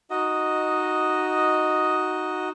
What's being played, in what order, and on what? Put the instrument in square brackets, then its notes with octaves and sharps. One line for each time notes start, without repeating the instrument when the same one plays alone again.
[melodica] D#4 F#4 D#5